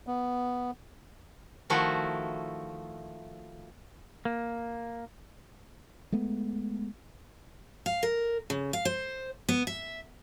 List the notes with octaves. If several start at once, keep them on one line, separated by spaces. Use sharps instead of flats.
B3
D#3 F3 A3 E4 F#4
A#3
G#3 A3 B3
F5
A#4
C#3
F5
C5
B3
E5